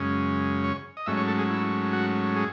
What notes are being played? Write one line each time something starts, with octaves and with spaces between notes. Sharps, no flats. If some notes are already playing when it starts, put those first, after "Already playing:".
Already playing: F#2 C#3 G#3 C#4
C#5
D#5
G#2 F#3 A3 C#4 E5
C#5
A4
G#4
E4
F#4
G#4